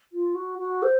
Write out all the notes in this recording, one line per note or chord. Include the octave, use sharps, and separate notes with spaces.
F4
F#4
F#4
C5